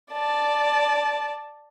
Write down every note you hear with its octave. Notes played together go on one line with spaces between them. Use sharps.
D5 A5